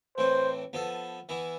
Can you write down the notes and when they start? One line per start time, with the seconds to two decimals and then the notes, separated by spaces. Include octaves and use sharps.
0.17 A2 E3 A3 C4 C5
0.73 F3 B3 F4 A4
1.29 E3 B3 E4